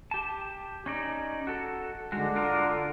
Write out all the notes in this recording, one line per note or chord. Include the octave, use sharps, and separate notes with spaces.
G4 A5
C#4 D#4 D5
F#4 A4
G#2 D3 G#3 F#4
D4 F4 A#4